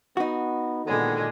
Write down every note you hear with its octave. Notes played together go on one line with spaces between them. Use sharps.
B3 D#4 F#4
A#2 D3 D#3 G#3 B3 A4